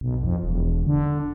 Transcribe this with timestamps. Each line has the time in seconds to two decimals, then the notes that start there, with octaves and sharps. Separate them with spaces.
0.01 B1
0.23 F2
0.43 E1
0.87 D3